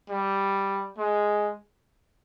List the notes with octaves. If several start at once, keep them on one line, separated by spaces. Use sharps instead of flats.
G3
G#3